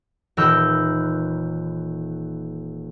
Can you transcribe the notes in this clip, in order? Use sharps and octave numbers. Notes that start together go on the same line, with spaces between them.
D#1 E3 A#4 E6 F#6 G6